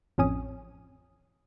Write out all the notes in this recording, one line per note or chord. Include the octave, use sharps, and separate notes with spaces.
A1 F2 C#4 D#6